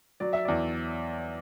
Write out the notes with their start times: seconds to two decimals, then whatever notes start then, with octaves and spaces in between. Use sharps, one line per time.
0.20 F#3 D5
0.33 E5
0.45 E2 D5